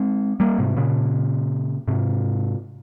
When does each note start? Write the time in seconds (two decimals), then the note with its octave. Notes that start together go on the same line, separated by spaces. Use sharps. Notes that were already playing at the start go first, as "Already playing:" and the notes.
Already playing: G#3 C4
0.40 G3 A#3
0.59 G#2 C3
0.77 A#2 C#3
1.88 G#2 C3